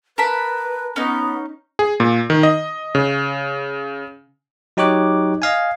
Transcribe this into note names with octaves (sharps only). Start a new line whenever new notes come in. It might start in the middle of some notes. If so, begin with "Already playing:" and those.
A#4 B4 A5 B5
B3 C#4 D#4
G#4
A#2
D#3
D#5
C#3
F#3 D#4 G4 C#5 D6 F#6
D#5 F5 G#5